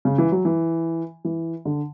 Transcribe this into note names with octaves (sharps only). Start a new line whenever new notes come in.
C#3
E3
F#3
E3
E3
D3